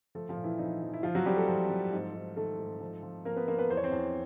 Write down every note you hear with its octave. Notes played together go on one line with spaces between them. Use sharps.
F3 A3 A4
F3 F4
A#2
E3 E4
F3 D#4
F3
E4
F3 F4
F#3 F#4
F3 G3 G4
A3 A4
F3
F3
G#2
G#2
D#3 A3 A4
G#2
F3
F3
F3 A#3 A#4
B3 B4
F3 A#3 A#4
B3 B4
E2 C5
C#5
C4 C5
E2